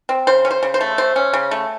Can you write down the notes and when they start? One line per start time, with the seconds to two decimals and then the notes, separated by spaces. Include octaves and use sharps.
0.09 C4
0.27 C#3 C5
0.45 C#4
0.51 C5
0.63 C#3
0.74 C5
0.81 A3
0.98 C#3 C5
1.16 C#4
1.33 C#3
1.51 A3